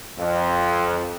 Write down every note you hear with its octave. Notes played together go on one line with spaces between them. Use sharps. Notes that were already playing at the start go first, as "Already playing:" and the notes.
F2